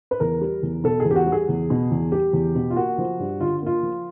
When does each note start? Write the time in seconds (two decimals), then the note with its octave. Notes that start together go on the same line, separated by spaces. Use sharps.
0.11 B4
0.20 E2 A#4
0.41 G3
0.63 E2
0.84 B2 A4
1.00 G#4
1.05 E2
1.11 G4
1.16 F#4
1.26 G3
1.32 G#4
1.49 E2
1.70 B2
1.91 E2
2.12 G3 G4
2.33 E2
2.55 B2
2.71 F4
2.76 A#3 F#4
2.98 F3
3.20 G2
3.40 D3 F4
3.62 A#3 F4
3.83 F3